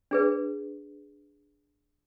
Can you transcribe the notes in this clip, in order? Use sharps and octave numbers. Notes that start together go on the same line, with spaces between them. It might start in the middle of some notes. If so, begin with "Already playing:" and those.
D4 G#4 B4